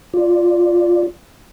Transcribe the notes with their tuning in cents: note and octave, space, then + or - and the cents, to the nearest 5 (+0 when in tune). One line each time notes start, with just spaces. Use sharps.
F4 +0 D5 +0